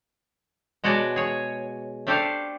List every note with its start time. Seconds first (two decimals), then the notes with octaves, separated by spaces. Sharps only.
0.84 B2 G#3 F#4 C#5 D5 A5
1.16 G#4 C#5
2.07 A3 D4 G4 A4 C5 F5